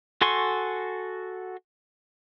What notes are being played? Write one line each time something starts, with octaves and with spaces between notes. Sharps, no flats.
F#4 A4 G#5 C6 C#6